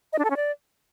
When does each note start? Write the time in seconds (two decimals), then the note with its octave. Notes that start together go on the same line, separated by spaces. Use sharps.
0.13 D#5
0.19 D4
0.25 A4
0.30 C#4
0.36 D5